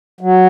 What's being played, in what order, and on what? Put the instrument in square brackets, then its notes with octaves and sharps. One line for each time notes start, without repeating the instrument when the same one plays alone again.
[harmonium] F#3